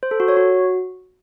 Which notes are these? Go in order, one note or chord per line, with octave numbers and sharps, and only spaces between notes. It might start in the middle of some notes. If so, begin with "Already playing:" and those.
C5
A4
F#4
C#5
F#4